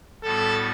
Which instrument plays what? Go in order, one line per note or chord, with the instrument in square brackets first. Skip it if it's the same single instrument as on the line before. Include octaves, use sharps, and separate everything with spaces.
[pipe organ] A2 G3 B3 F#4 [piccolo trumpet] A4